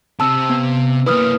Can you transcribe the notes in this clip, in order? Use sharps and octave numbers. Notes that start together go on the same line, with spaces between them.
C3 C4 A5 E6
B3
A#3 E4 B4 D#6 F6